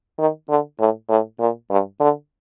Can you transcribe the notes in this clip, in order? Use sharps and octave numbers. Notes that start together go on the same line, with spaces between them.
D#3
D3
A2
A2
A#2
G2
D3